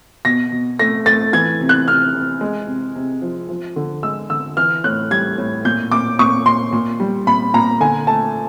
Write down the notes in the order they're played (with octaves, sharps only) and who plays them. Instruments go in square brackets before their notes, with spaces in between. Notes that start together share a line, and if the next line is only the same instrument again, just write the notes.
[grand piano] B2 A#6
B2
A3 A#6
A3 A6
E3 G#6
C3
F#6
C3 F6
C3
G#3
C3
C3
F3
F3
D3
G#3 E6
D3 E6
E3 F6
A2 F#6
G3 G#6
A2
A#2 G6
A#2 D6
A#2 C#6
A#2 C6
A#2
G3
A#2 B5
A#2 A#5
D3 G#5
A3 A5